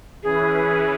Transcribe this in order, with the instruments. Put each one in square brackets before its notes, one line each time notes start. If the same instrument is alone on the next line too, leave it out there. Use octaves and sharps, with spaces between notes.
[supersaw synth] E3 C#4 E4 B4 [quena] G#4